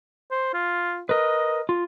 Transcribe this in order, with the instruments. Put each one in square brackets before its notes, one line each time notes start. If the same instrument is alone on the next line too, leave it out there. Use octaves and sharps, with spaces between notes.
[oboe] C5
F4
[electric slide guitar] A#4 B4 [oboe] D#5
[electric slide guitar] F4